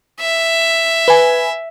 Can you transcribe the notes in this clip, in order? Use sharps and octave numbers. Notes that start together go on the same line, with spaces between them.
E5
B4 G#5